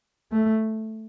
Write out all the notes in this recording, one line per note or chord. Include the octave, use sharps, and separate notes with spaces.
A3